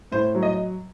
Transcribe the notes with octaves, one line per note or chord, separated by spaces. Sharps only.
A2 C5
F#3
D#5